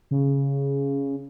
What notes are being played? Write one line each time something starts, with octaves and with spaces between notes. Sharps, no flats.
C#3